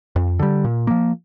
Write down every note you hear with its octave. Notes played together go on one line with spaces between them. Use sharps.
F2
D3 G3
A#2
F3 A#3